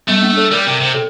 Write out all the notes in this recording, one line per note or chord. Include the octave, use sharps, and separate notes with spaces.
G3 A3
A#3
A4
G3 A#4
C3
C3
A4